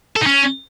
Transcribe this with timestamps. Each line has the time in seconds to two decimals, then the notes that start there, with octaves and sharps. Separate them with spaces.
0.16 A4
0.21 D#4
0.26 C#4